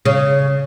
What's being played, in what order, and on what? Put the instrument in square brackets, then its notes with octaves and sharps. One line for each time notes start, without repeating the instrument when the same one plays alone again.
[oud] C#3